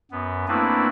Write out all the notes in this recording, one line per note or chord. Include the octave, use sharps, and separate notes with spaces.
F#2 B3
A3 A#3 C4 D4 E4 B4